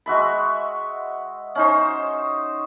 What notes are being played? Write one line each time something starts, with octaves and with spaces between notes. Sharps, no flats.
G#3 F#4 E5 B5
C#4 D#4 C5